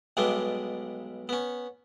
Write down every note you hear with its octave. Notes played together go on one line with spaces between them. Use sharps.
B1 G2 G3 G#3 B3 D4
B3 C#4